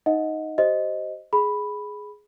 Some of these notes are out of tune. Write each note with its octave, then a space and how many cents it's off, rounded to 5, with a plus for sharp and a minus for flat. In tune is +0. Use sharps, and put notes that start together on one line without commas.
D#4 +0 D#5 +15 F#5 -20
G4 -30 C5 +0 D#5 +0
G#4 +5 B5 +0